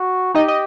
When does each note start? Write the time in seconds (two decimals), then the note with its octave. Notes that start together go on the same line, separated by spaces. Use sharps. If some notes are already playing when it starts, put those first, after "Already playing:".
Already playing: F#4
0.34 D#4 G4 D#5
0.48 D#5